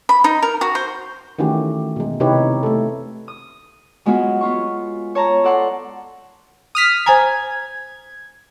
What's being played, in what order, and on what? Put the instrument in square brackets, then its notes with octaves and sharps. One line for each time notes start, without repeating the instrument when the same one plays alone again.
[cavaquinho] B5
D#4
A#4
F#4
C5
[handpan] D#3 E3 A3 C#4 F#4 G4
B2 G#3
C3 D#4 E4 G4 B4 C#5
A3 A4
[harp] D#6
F#3 G#3 B3 F4 F#4
B3 F4 C#6
C#5 A5 A#5
A4 D5 F#5 C6
[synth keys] D#6 F6 B6
[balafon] C5 G#5 A#5 [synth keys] G#6